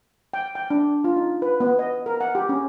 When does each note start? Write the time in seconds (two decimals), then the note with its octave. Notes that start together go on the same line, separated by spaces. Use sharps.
0.34 G5
0.55 G5
0.70 D4
1.04 F4
1.16 D#4
1.42 B4
1.60 B3
1.79 D#5
2.06 A#4
2.21 F#5
2.35 G4
2.49 C#4